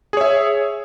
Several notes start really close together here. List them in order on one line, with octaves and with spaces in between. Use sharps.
G#4 C#5 E5